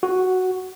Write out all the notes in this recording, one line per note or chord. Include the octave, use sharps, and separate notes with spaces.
F#4